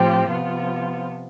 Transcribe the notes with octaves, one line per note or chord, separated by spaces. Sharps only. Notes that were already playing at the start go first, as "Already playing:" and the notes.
Already playing: A2 F3 C4 G4
C3 F3 B3 F4